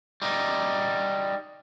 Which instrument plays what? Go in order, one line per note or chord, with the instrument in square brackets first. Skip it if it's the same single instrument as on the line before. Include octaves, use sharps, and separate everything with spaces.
[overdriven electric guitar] G3 D#4